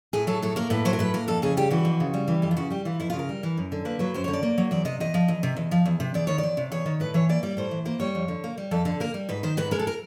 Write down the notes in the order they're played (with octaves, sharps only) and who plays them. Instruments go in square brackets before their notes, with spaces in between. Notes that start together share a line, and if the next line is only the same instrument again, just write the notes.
[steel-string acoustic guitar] A2 G#4
F#3 A4
A2 A4
A#3 A#4
A2 B4
F#3 C5
A#4
A2 B4
A#3 A#4
F2 A4
C#3 G#4
G3 G4
E3 F#4
F2
C#3
G3
E3
F2 G4
F4
C#3 F#4
G3 G4
E3 F4
F2 E4
F4
C#3
A#4
G3
E3
F#2
D3
A#3 B4
F#3 B4
F#2 C5
C#5
D3
D5
A#3
F#3
E2 D5
C3 D#5
E2 D#5
F3
E2
C3
E2
F3
E2
C3
E2 D5
D#3 C#5
D5
E2
C3
E2 C#5
D#3
A2 B4
E3 C#5
A#3 D5
G3 D5
A2 C5
E3
A#3 C5
G3 C#5
F2
D3
A#3
G3
F2 A4
D3 A4
A#3 A#4
G3
G#2 B4
D#3 C5
G#2 B4
G#3 A#4
A4
A#4